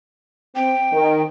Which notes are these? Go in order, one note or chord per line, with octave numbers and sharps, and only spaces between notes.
C4 G5
D#3